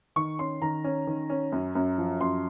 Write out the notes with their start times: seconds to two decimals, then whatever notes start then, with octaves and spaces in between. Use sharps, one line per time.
0.16 D#3 C#6
0.39 C#4 C6
0.62 D#3 A#5
0.84 C#4
1.07 D#3
1.30 C#4
1.52 F#2
1.75 F#2
1.98 F3
2.21 F#2 C6